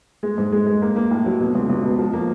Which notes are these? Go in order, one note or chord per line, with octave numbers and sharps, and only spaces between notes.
G#3
G#2
G#3
G#3
A#3
A#3
A2
F#3
B2
C#2
C#2
B2
F3
A#3